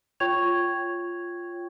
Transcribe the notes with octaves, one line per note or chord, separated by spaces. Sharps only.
F4 C#5 G5 C#6 G#6 F7